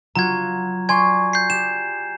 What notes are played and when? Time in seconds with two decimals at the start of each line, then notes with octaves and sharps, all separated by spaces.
0.16 F#3 F4 F#4 A#5 G#6
0.89 D5 G#5 C6 C#6 G#6
1.33 G6 C7
1.50 G4 E7